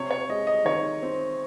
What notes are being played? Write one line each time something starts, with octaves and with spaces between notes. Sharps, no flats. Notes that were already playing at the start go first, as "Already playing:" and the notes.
Already playing: C3 C#5
C#5
G#3 D#5
D#5
D#3 C#5
C4